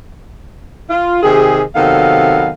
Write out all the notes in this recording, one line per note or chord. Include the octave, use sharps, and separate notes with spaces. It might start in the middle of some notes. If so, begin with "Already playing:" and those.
F4
C3 D#3 G4 G#4
C3 D#3 F#3 B3 A4 F5